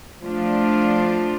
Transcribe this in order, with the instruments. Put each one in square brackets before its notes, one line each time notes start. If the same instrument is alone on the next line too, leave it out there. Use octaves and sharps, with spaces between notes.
[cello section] F3 A3 D4 F4